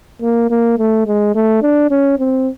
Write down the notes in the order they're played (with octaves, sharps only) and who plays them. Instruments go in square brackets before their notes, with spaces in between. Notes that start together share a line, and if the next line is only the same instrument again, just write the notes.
[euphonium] A#3
A#3
A3
G#3
A3
D4
C#4
C4